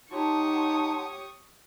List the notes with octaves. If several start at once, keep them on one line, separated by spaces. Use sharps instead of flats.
D#4 G4 C#5 F#5 A5 C6 C#6 D#6